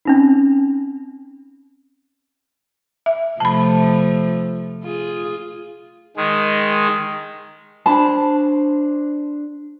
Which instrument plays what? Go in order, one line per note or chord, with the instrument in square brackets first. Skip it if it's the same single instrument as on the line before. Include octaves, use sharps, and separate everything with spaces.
[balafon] C4 C#4 D#4
E5
[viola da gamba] C3 F3 A3 [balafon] A5 B5
[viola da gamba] F4 G#4
[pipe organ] D#3 G#3
[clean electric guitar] D4 C5 [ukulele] A5 B5